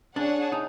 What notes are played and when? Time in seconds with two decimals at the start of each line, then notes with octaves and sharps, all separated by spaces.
0.16 D4 G#4 C#5 F#5 A5
0.52 D#4